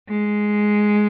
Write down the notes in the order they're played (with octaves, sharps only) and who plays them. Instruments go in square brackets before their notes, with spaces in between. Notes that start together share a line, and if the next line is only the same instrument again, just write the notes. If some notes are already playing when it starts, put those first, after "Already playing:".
[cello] G#3